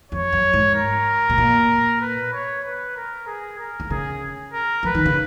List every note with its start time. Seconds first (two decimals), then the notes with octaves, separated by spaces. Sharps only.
0.12 F2 C#5
0.32 F#2
0.53 G#2
0.75 A#4
1.30 B2
1.38 A#2
2.01 B4
2.33 C#5
2.64 B4
2.96 A#4
3.27 G#4
3.59 A#4
3.80 D#3
3.90 C#3 G#4
4.53 A#4
4.83 F3 B4
4.95 D#3
5.06 C#3